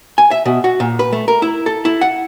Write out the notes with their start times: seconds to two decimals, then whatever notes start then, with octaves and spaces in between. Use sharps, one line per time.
0.18 G#5
0.31 E5
0.45 B2
0.64 F#4
0.80 A#2
0.99 B4
1.12 A3
1.28 A#4
1.42 E4
1.66 A4
1.85 E4
2.01 F#5